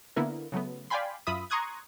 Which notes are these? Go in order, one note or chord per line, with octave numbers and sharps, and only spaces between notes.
D3 A#3 B3 E4 A#4
C#3 F#3 A3 B3
D5 F5 G5 G#5 B5 C6
F#2 F4 E5 B5 D#6
A#5 C6 C#6 D#6 F#6 G#6